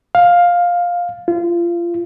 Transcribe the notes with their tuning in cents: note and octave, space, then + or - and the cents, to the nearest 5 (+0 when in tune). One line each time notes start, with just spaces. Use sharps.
F5 +10
F4 -25